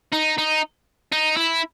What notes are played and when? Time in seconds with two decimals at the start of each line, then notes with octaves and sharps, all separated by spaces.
0.13 D#4
0.38 D#4
1.13 D#4
1.37 E4